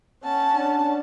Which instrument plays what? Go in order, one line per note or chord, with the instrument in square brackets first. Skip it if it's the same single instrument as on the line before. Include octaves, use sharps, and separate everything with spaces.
[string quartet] C#4 F#5 A5
[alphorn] D4